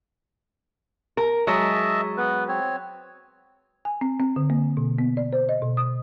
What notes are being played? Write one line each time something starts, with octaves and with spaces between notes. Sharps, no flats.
A#4
F#3 G#3 D#5 E5 A5
B3 B4
C4 C#5
G#5
C4
C4
D3
A#3
B2
B3
D5
C5
D#5
B2
D#6